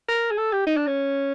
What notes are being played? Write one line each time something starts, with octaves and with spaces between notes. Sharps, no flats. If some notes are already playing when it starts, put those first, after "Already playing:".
A#4
G#4
A4
G4
D#4
D4
C#4